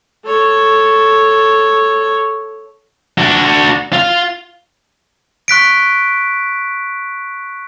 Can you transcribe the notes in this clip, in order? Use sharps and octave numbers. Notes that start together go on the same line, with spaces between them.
A4 C#5
D4 F#4
F4 F5
C#6 F#6 B6 D7